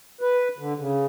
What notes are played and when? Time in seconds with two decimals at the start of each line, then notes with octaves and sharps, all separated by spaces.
0.21 B4
0.58 D3
0.79 C#3